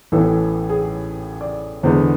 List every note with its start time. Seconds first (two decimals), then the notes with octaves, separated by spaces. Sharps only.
0.12 A1 A2 E3 B3 A4
0.70 G#4
1.41 D5
1.83 E2 D3 G#3 B3 C5